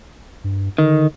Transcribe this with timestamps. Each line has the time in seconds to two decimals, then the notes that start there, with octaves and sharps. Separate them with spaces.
0.44 G2
0.78 D3 D#3